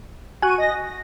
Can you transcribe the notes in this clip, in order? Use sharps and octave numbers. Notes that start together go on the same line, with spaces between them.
F#4 G#5 C#6 F#6 D#7
D#5 A#6
A#6